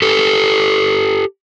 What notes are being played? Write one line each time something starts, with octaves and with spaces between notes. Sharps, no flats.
G4 A4